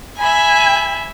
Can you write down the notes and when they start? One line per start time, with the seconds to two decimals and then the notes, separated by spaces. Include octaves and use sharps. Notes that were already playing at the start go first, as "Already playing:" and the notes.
0.18 E5 G#5 B5